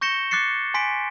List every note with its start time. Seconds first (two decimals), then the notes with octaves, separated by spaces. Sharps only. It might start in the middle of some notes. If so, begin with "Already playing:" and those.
0.01 C#6 G6 A#6 C#7 E7 G7
0.31 D6 F#6 A6 C7 C#7
0.74 G#5 C6 B6 D7